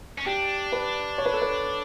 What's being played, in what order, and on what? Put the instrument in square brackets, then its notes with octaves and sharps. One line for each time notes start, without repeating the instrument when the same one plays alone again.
[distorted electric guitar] C#4
[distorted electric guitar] D4 [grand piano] G4
[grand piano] B4
C#5
B4
A4
B4